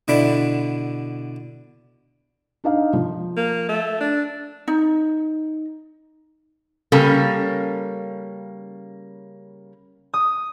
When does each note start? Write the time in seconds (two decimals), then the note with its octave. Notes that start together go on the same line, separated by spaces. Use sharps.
0.08 B2 D3 D4 E4 B5
2.64 D4 D#4 F5
2.93 F3
3.37 A#3
3.69 A3
4.01 D4
4.68 D#4
6.92 C#3 G3 A#3 C#4 A4
10.14 D#6